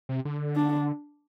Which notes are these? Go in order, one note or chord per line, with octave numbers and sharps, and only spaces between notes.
C3
D3
D4